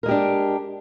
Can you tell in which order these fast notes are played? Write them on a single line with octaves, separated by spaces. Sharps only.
A#4 G#3 G4 D4